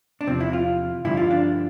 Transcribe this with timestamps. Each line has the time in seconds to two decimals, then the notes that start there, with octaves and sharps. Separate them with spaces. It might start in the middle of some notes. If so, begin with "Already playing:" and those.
0.21 D4
0.27 E2 C3 F3 C4
0.40 E4
0.53 F4
1.05 G2 D3 F3 E4
1.17 F4
1.31 D4